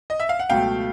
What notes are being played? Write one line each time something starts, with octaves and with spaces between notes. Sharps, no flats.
D#5
E5
F5
F#5
C#2 B2 F#3 A3 F5 G5